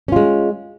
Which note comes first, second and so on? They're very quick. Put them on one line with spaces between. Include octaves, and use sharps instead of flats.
C#4 F4 G#3